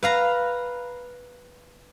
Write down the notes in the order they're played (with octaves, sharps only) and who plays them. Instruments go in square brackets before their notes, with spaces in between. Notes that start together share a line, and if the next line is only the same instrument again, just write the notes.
[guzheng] B4 F5 A#5